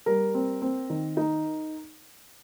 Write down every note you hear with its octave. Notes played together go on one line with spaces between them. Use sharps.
G3 A#4
C4
C4
D#3
D#4